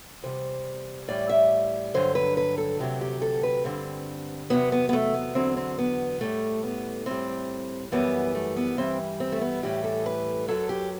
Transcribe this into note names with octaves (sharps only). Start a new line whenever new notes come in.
E2 C3 G3 C5
A2 E3 G3 D5
E5
G2 D3 F#3 C5
B4
B4
A4
D2 C3 F#3 G4
G4
A4
B4
G2 D3 G3 C4
E2 C3 F#3 B3
B3
B3
A3
B3
E2 D3 F#3 C4
C4
B3
A2 G3 A3
B3
A2 G3 C4
F#2 E3 G3 B3
A3
B3
G2 E3 G3 C4
C4
A3
B3
A2 E3 G3 G4
A4
B4
F#2 F#3 A4
G4